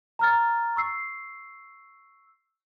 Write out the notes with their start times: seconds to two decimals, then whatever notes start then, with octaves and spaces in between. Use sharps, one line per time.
0.19 A#5 F6 A6
0.76 C#6 E6 C7